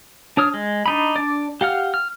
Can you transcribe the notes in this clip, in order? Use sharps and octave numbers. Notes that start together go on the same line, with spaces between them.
D4 C#5 D#6 F6
G#3
D4 D#4 B5
D4 D5
G4 F5 F#5 F6
F6